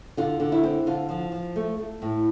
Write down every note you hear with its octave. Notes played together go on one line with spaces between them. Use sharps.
D3 F4
D3
E4
C4
D3 F4
F3
F3
A3
A3
A2